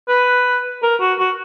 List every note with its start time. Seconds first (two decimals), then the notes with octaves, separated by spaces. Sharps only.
0.08 B4
0.82 A#4
1.00 F#4
1.19 F#4